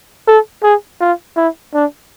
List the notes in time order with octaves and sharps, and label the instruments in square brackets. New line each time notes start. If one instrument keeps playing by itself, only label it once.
[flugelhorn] A4
G#4
F4
E4
D4